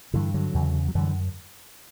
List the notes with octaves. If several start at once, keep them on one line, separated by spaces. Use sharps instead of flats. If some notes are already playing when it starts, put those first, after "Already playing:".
G2 D3 E3
D3 F#3
E2 C#3
F#3
F#2 D3 E3 G3